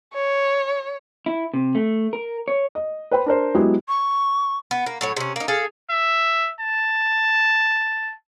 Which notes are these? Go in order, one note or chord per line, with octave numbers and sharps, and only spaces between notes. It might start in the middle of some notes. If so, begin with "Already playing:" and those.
C#5
E4
C3
A3
A#4
C#5
D#5
B4 C5 G5 B5
D4 A#4 C5
F#3 G#3 B3 E4 F#4 G4
C#6
B3
A#3
A2 F#3 C#5
C3 C#4
A#3 D#4
G#4 A4 F5
E5
A5